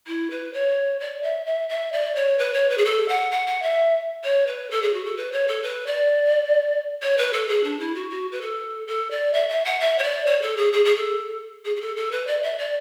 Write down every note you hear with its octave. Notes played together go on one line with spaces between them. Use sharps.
E4
B4
C#5
D5
E5
E5
E5
D5
C#5
B4
C#5
B4
G#4
A4
F#5
F#5
F#5
E5
C#5
B4
A4
G#4
F#4
A4
B4
C#5
A4
B4
D5
C#5
B4
A4
G#4
D4
E4
F#4
F#4
B4
A4
A4
D5
E5
E5
F#5
E5
C#5
D5
C#5
A4
G#4
G#4
G#4
A4
G#4
G#4
A4
A4
B4
D5
E5
D5